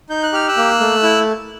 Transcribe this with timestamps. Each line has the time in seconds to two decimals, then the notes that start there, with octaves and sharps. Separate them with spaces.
0.10 D#4 G6
0.23 F#6
0.33 G4 F6
0.48 E6 F#6
0.57 A#3
0.80 A3
1.03 E4